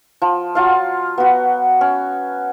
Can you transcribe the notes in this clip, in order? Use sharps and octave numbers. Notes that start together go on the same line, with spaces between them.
F3
F#3 F4 F5
B3 F#4
C#4